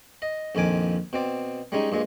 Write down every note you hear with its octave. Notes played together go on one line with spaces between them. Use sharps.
D#5
A#1 F2 D#3 G#5 D6
B2 C4 D5
G3 G#3 C#4 D#4
G2 A#2 G#3